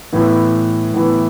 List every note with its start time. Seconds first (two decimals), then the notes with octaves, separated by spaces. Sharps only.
0.12 A2 E3 B3
0.94 A2 E3 B3